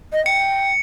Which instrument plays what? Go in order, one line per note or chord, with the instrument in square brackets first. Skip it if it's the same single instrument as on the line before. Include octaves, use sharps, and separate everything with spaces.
[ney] D#5
[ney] G5 [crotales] C#7